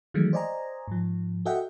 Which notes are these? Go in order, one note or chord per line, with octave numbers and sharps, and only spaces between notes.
D#3 E3 F#3 G#3 A3
C5 D5 D#5 G#5 A#5
G#2 F3
F#4 A4 D#5 E5 F#5 G5